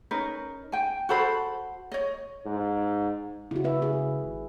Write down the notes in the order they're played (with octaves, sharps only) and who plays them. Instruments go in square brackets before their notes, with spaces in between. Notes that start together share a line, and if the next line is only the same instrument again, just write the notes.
[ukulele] C#4 D#4 A#4 B4
G5 G#5
F#4 A4 C5 B5
C#5 D#5
[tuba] G#2
[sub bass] C#3 [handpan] E4 F#4
[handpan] E4 B4 E5
G#4
[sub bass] G#1